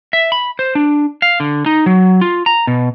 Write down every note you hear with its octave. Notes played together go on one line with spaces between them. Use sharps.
E5
B5
C5
D4
F5
D3
D#4
F#3
F4
A#5
B2